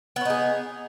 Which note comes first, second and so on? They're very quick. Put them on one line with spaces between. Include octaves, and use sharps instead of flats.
B3 C#4 D#4 G#4